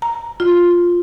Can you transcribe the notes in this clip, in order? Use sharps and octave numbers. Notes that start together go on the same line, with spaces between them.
A#5
F4